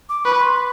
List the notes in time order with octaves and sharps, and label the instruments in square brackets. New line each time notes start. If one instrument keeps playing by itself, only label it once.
[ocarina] D6
[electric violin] B4 [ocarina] C#6
[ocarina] C6
B5